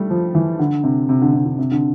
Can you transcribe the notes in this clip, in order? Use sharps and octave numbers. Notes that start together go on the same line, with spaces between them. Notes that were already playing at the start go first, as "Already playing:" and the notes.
Already playing: G3 A3
F3
E3
D3
C3
C3
D3
C3
D3
C3
D3